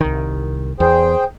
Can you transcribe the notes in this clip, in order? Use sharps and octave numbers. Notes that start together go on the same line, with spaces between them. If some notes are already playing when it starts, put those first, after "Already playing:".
C2 D#3
E2 G#4 C5 G5